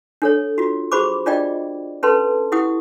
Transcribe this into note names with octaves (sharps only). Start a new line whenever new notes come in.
D4 A4 C#5
F4 F#4
F#4 G#4 C5 B5 C#6 D6
D4 F4 D5 D#5 G5
C#4 A4 B4 A5 C6
E4 G4 F#5 D#6